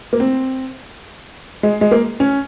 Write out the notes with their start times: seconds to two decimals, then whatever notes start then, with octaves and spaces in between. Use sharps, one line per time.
0.13 A#3
0.20 C4
1.63 G#3
1.81 G#3
1.91 A#3
2.20 C#4